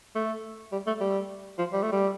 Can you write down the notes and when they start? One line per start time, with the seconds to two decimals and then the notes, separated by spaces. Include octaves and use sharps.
0.15 A3
0.72 G3
0.87 A3
1.01 G3
1.58 F3
1.73 G3
1.82 A3
1.92 G3